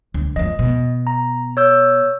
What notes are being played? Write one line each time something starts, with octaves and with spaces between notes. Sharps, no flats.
D2
F#2 F3 D#5
B2
A#5
C#5 E6 G6